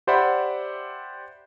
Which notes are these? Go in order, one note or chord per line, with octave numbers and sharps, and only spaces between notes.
G4 C5 D5 E5 F#5 B5